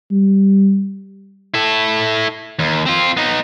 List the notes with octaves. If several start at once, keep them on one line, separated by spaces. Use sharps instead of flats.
G3
E4 A4
D#2
C4 F4
B3 D#4